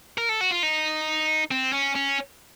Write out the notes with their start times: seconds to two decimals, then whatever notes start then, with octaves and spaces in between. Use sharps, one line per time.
0.18 A#4
0.29 A4
0.41 F#4
0.51 F4
0.63 D#4
1.51 C4
1.73 C#4
1.95 C#4